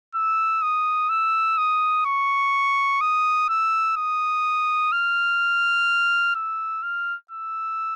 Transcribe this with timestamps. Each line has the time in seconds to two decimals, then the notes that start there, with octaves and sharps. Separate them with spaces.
0.15 E6
0.62 D#6
1.09 E6
1.58 D#6
2.06 C#6
3.01 D#6
3.49 E6
3.97 D#6
4.92 F6
6.36 E6
6.83 F6
7.31 E6